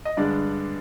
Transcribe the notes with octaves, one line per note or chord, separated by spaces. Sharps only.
D#5
G2 D3 G#3 D4 D5